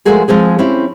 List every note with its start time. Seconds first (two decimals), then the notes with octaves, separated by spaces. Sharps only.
0.05 F3 G#3 A3 F#4 G#4 A#4
0.28 F3 G#3 C4 G#4
0.59 C4 C#4 E4 G4